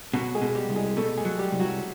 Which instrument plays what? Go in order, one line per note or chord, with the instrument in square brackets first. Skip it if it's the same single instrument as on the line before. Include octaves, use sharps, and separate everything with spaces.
[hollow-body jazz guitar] B2 [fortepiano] F#3 F#4
[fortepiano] G#3 G#4
[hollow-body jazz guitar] B2
[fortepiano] G3 G4
[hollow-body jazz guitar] C2
[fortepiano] G#3 G#4
[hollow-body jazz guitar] B2 [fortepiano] A3 A4
[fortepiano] G#3 G#4
[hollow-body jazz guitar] F#3
[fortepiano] G3 G4
[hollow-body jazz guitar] C2
[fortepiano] F#3 F#4